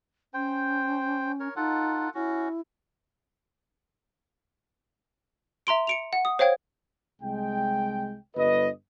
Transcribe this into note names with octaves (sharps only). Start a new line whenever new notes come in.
C#4 C5 G5
A#4 C#5
D#4 F4 A4 F#5
C#4 E4 F#4
E5 A#5 C6 D7
C#7 D7 F7
F#5
D#6
C5 C#5 F5 G5 G#6
C2 G#3 G5
G1 B4 D#5